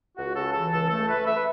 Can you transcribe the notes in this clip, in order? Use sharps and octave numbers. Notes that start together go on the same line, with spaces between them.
C#2 F#4
C#3 A4
E3 A4
C#2 A4
A3 A4
A3 B4
A3 E5
B4